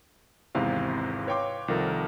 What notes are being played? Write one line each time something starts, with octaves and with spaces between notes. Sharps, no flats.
G#1 E2 G#2 C3 E4 F5
B4 C#5 F5 G5 C6 D6
C2 D#3 F3 A4 A#4